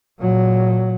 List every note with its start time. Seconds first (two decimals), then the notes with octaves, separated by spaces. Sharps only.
0.19 A#2 F#3